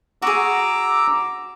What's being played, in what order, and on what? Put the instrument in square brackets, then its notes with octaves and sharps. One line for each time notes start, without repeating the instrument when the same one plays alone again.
[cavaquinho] F#4 G#4 [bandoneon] A#5 D6 E6